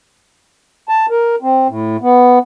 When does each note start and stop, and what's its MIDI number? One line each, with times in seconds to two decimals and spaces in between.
0.89 1.06 81
1.10 1.36 70
1.42 1.68 60
1.69 1.97 45
2.02 2.39 59